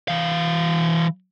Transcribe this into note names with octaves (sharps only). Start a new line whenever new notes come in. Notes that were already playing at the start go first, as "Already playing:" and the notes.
E3 F5